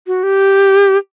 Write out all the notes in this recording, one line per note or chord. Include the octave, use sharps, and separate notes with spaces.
F#4
G4